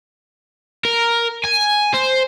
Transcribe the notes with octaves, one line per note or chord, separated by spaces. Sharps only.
A#4
G#5
C5